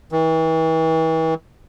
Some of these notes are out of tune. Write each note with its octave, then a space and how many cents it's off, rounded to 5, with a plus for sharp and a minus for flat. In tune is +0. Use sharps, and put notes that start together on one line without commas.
E3 -40